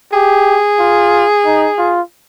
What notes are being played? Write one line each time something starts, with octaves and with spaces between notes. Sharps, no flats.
G4 G#4
F4
D#4
F4